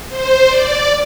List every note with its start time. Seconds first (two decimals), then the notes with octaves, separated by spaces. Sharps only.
0.09 C5
0.47 D5